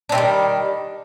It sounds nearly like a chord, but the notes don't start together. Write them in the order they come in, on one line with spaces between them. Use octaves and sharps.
D4 C3 G3 D#3